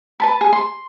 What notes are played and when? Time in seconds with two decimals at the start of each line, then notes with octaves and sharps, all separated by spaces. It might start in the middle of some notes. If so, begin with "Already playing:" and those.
0.20 B4 A5 B5
0.41 G#4
0.53 C6